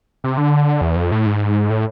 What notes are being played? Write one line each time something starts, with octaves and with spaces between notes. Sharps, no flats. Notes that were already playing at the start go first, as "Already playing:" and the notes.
C3
D3
E2
F2
A2
G#2
A2